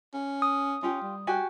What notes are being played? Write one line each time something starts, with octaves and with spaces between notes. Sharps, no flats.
C#4
D#6
C#4 F4 G4
G3
F#4 G4 G#5